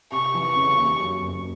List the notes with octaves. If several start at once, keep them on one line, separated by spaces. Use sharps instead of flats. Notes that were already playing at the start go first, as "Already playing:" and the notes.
C3 C#6
E3
C#3
D#2
F#2
F#1